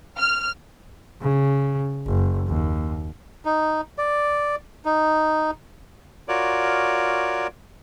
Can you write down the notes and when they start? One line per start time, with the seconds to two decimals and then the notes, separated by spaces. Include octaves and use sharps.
0.17 F6
1.21 C#3
2.06 F#1
2.48 D#2
3.45 D#4
3.98 D5
4.85 D#4
6.28 F4 F#4 A#4 C#5 D5